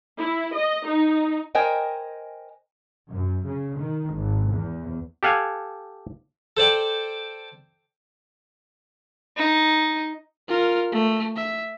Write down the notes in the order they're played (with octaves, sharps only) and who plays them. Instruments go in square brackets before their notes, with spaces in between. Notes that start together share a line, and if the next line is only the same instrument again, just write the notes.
[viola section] E4
D#5
D#4
[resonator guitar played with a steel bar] A#4 C5 D#5 G5 G#5
[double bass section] F#2
C#3
D#3
G#1
E2
[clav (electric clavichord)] G4 A4 F5 F#5 G#5
[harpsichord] A4 C5 D5 G5
[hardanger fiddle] D#4
[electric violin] F4 A#4
A3
E5